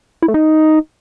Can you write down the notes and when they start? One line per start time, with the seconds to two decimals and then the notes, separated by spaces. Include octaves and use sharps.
0.22 E4
0.28 A3
0.34 D#4